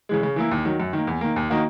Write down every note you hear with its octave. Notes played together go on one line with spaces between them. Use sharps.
C#3 E3 G#3
C#3
E3 A#3 E4
D#2
D#3 F#3
F#2
D#3 A#3
E2
D#3 A#3
D#2
D#3 A#3 D#4 F#4